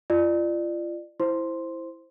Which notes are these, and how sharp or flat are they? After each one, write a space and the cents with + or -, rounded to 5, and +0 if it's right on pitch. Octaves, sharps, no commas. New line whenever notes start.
F4 -35 D5 +25
E4 +5 C5 +0 C6 +0